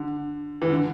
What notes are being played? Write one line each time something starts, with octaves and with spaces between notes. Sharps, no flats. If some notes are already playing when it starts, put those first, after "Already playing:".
Already playing: D3
E3
D3